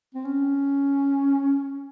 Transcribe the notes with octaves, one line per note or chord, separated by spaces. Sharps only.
C4
C#4